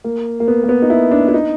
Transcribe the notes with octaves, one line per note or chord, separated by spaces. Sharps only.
A#3
A#3
B3
A#3
B3
D#4
E4
D4
E4
D#4